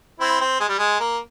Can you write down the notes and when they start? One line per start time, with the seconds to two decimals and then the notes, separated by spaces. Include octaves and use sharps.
0.20 C4 E4
0.41 C4
0.60 G#3
0.69 G3
0.78 G#3
1.00 A#3